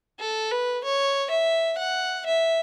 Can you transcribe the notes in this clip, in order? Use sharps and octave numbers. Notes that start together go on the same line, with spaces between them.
A4
B4
C#5
E5
F#5
E5